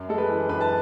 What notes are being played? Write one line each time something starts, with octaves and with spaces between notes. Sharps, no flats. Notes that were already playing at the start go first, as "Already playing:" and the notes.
Already playing: F#2
G#3 A4
B4
E3
F#2 B4
A5